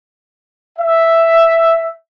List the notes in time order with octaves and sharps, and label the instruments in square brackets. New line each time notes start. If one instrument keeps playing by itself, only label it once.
[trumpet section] E5